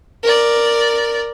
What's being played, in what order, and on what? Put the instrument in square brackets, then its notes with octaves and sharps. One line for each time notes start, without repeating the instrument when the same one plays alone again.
[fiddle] A#4 D5